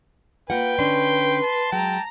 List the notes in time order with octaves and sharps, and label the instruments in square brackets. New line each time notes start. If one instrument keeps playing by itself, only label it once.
[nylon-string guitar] A#3 F4 F#5 [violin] B4 [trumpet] G5
[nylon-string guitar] D3 C#4 D4 [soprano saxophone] C6
[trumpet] A5
[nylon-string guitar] F#3 G#3 [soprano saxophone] G5 [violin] A#5